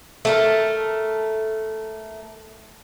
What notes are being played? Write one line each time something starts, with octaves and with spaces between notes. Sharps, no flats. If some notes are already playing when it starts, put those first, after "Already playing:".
A3 A4 A#4